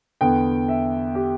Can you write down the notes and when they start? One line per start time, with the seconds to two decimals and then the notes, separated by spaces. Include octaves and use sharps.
0.21 E2 D3 B3 G5
0.68 E5
1.15 G4